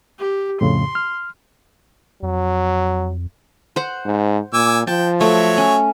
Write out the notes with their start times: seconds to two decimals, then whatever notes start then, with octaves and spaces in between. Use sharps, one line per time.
0.19 G4
0.61 F2 A2 C#3 C6
0.95 F6
2.22 F2 F#3
3.76 C5 F#5
4.05 G#2
4.54 A#2 G#5 D6 E6
4.87 F3 G5 A5
5.21 F#3 A3 C#5 E5
5.58 C#4